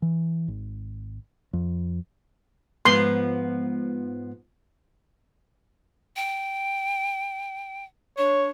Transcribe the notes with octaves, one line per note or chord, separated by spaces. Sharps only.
E3
G#1
F2
G#2 F3 B3 C6
G5
D4 C#5